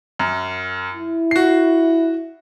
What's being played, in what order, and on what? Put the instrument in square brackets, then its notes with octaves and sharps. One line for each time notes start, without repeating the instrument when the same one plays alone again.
[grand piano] F#2
[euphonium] E4
[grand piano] F#4 C7